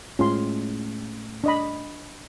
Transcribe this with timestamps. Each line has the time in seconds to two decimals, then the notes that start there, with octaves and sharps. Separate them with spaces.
0.19 A2 G#3 C#4 F4 C6
1.44 D4 D#5 B5